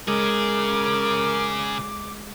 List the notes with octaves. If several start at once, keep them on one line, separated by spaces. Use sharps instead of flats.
C#3 G#3 G#4 A#4 D6